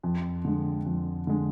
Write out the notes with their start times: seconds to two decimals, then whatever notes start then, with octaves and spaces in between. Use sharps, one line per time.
0.03 F2
0.45 D3 G#3
0.86 F2
1.27 D3 G#3